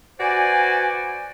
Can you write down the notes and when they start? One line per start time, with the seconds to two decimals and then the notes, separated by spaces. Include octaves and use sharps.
0.20 F#4 B4 C5 D5 G#5